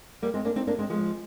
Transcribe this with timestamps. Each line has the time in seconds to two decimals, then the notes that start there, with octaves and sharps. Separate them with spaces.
0.22 G3 A#3
0.34 G#3 C4
0.45 A#3 D4
0.56 C4 D#4
0.67 A#3 D4
0.79 G#3 C4
0.90 F3 G#3